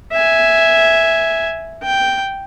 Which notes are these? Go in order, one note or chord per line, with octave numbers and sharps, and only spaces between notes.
E5 G#5
G5